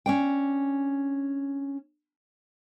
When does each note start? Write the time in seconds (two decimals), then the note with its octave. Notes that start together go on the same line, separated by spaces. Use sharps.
0.06 C#4 D4 G5